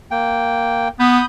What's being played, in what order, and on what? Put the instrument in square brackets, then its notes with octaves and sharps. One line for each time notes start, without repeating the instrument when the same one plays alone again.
[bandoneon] A#3 G5
[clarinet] B3 [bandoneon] B5 D#6 G6